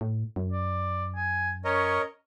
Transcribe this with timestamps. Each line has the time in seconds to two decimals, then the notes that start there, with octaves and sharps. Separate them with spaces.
0.01 A2
0.36 F#2
0.52 D5
1.16 G#5
1.65 C#4 A#4 C#5 D#5